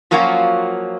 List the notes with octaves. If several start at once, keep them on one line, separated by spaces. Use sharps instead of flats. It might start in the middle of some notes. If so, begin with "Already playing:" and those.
F3 F#3 A#3 C#4 F4 F#4